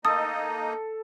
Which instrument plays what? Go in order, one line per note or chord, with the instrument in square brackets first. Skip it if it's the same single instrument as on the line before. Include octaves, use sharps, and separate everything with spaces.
[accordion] A#3 D#4 D#5 [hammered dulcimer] A4 [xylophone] D#6